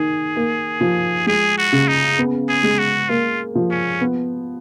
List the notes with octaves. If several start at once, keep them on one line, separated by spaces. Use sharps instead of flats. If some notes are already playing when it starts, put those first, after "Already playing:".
Already playing: D#3 G#4
A#3
F3
G#3 G#4
F#4
C#3
D#4
B3
G#4
G#3
F#4
A#3 F4
F3
C#4
B3